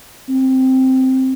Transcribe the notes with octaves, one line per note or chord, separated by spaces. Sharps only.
C4